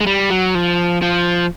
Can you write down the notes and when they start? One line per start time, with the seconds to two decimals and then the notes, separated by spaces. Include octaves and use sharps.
0.01 G#3
0.07 G3
0.30 F#3
0.55 F3
1.02 F3